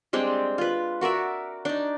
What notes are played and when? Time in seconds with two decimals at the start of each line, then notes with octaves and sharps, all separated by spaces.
0.13 G3 G#3 C4 D4
0.58 F4 B4
1.01 F#4 A#4 D5 E5
1.65 D4 D#4